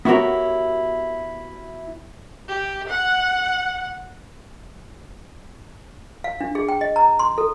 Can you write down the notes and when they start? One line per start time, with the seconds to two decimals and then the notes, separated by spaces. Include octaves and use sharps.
0.05 B3 E4 F#4 G4 A#4 C#5
2.48 G4
2.88 F#5
6.24 F5
6.41 D4
6.55 G#4
6.69 G5
6.81 D#5
6.96 A#5
7.19 C6
7.38 A4